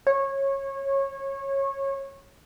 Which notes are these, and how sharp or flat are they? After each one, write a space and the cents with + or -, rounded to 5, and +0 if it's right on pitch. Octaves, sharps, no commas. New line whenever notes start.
C#5 -20